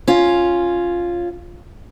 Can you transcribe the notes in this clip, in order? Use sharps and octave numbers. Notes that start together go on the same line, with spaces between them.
C#4 F4